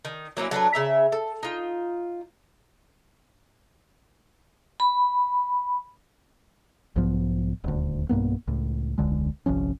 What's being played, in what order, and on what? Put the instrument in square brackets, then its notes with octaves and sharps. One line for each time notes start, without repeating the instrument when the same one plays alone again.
[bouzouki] D#3
F#3 A#3 C#4 E4
F#3 A3 D4 B4
C#3 E5 A#5
A4
D#4 F4
[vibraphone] B5
[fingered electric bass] B1 G#2 F3 B3
D#1 D2
B1 G2 A#3 B3
C#2 A2
E1 C#2 D3 G#3
G1 C2 F3 C#4